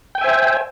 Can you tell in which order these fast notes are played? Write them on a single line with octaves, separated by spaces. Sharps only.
G5 G#5 E5 C5